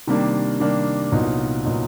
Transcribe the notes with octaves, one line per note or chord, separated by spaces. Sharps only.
C3 D#3 G3 A#3 D4
C3 D#3 G3 A#3 D4
C2 A#2 F#3 B3 D#4
A#2 F#3 B3 D#4